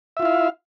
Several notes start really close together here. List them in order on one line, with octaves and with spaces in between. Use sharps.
E5 F4 E4 F5